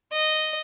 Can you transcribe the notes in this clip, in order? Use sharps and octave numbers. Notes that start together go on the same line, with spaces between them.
D#5